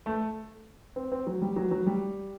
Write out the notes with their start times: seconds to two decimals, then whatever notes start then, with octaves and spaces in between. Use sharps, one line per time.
0.06 A3
0.96 C4
1.12 C4
1.27 F#3
1.42 G3
1.56 F#3
1.71 F#3
1.86 G3